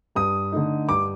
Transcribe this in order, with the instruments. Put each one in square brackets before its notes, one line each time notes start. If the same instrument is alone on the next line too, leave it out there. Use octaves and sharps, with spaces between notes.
[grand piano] G2 D#6
D3 A3 D#4
G2 D6